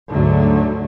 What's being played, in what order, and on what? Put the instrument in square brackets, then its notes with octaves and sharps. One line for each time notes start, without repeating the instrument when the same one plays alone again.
[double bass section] D2 G#2 D3 F#3 A3